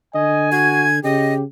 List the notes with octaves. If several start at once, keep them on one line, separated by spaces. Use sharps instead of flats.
D3 D#5 G#5
F#4 G#6
C#3 G4 D#5